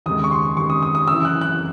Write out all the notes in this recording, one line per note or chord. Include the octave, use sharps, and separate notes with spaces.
D#2 C#3 G#3 D#6
C#6
C6
D#2 C#3 G#3 C#6
D#6
D#6
D#6
F#1 F#2 E3 E6
F#6
F#6